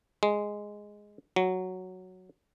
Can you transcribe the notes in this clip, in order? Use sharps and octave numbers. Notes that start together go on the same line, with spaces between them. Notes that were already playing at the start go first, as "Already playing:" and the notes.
G#3
F#3